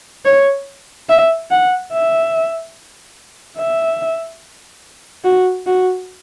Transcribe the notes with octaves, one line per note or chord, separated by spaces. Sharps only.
C#5
E5
F#5
E5
E5
F#4
F#4